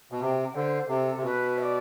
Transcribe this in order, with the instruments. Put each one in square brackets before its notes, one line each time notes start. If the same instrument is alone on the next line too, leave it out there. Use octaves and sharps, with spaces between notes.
[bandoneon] B2
[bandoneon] C3 [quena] G5
[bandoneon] D3 [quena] C5
[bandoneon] C3 [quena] A4
[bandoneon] C3
[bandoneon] B2 [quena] B4
[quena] E5
D5